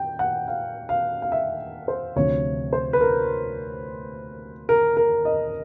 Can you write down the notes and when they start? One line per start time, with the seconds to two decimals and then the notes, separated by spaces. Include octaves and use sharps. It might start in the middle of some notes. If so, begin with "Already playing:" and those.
Already playing: G5
0.19 F#5
0.48 F5
0.89 F5
1.22 F5
1.32 E5
1.88 C5
2.16 D2 C3 F3 C#5
2.73 C5
2.93 B4
3.01 A#4
4.69 A#4
4.97 A#4
5.25 D#5